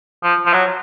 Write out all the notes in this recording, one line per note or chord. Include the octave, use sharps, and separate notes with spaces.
F3
F3
F#3